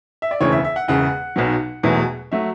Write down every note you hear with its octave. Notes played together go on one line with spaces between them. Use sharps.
E5
D5
E1 D2 C#3 E3 C#5
E5
E5
F#5
E1 E2 C#3 F#5
B1 B2 F#3
E1 E2 B2 F#3 A3
F#3 A3 E5